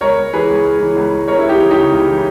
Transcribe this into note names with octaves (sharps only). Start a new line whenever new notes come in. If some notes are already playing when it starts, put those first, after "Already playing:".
C#2 A#4 C#5
C#2
E3 G#4 B4
C#2
C#2
E3
C#2
C#2
C#2 A#4 C#5
E4
C#2
D#4 G4
E3
D#4 G4
C#3
C#2
E3